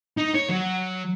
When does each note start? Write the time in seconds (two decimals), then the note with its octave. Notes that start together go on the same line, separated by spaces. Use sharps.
0.17 D#4
0.34 C#5
0.49 F#3